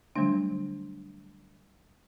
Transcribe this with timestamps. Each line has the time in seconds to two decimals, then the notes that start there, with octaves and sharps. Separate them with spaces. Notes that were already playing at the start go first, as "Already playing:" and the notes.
0.16 D3 F#3 G3 A3 D4